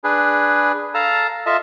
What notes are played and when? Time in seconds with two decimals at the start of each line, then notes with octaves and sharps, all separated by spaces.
0.04 D4 G#4 B4
0.94 A4 F5 A5 A#5
1.46 F4 A4 D#5 E5 A5